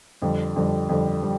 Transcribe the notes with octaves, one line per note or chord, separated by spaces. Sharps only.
F2 D3 G3
F2 D3 G3
F2 D3 G3
G3